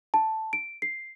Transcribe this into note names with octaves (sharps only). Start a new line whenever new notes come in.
A5
D7
C7